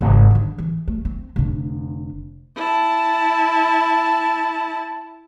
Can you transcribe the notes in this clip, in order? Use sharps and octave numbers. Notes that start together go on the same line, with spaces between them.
G#1 C#3
D3 D#3
E3
A3
C4
F1 D3
E4 A5